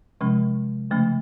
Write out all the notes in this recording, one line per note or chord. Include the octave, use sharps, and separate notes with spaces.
C3 F3 G#3 C#4
C#3 F3 A3 C#4